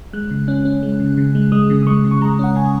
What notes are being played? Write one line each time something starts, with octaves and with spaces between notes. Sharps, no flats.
G#3 F#6
C#3
C#4 F#6
C#4
G#3
C#3
C#3
G#3
G#3 D#6
C#3
D#6
G#3 C#6
C#3
C#6
G#3 A#5
C#4 F#5
C#3 G#5